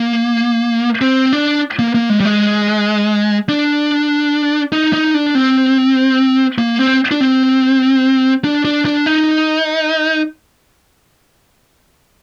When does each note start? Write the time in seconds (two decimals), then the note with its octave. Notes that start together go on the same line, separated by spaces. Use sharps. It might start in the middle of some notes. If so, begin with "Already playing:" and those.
Already playing: A#3
1.01 C4
1.33 D4
1.79 A#3
1.95 A#3
2.10 G#3
2.20 G3
2.25 G#3
3.49 D4
4.73 D#4
4.93 D#4
5.14 D4
5.35 C4
6.58 A#3
6.79 C4
7.11 D4
7.21 C4
8.44 D4
8.65 D4
8.85 D4
9.06 D#4